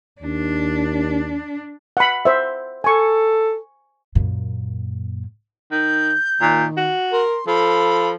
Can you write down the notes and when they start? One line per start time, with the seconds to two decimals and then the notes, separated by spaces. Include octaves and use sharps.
0.22 D#2 D4
1.97 F#5 B5
2.25 C5 E5
2.84 A4 G#5 C#6
4.15 F#2 A#2
5.71 D#3 G6
6.41 A#2 D#3
6.77 F#4
7.12 A#4 C6
7.47 F3 A4 B5